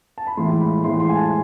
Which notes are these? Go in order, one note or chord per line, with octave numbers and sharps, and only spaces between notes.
A5
B5
A2 E3 G#3 C6
B5
A2 E3 G#3 C6
C6
G#5
A5